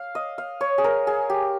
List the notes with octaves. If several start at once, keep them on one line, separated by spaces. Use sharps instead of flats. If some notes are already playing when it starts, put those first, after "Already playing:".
Already playing: F5
D#5
F5
C#5
G#4
A#4
G#4
G4